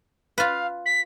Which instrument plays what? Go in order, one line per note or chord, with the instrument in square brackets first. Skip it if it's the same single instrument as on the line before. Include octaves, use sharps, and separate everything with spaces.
[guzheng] F4 B4 [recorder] F5
[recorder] B6